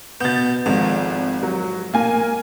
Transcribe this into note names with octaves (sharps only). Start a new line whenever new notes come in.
B2 B3 G6 A6
G#1 F2 G#2
F#3
A#3 G#5